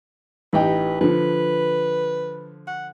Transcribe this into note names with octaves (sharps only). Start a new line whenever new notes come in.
A1 D#4 G4 B4
D3 F3 B4
F#5